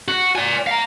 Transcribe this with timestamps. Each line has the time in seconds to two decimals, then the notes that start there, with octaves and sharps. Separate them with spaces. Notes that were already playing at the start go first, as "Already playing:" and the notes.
0.08 F#4
0.36 D5 G#5
0.67 F5 A#5